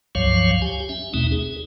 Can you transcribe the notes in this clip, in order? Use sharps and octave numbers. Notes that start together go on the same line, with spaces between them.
C#2 G2 F3 F#3 C#5 F5
G4 G#5
C#4 E5
D#2 B2 A3 C4 D#4
G#4